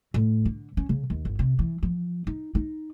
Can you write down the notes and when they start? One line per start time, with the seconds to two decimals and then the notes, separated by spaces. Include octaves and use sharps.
0.14 A2
0.45 D3
0.77 C#4
0.89 C#3
1.10 D#2
1.25 G1
1.39 C3
1.59 E3
1.83 F3
2.27 D#4
2.55 D#4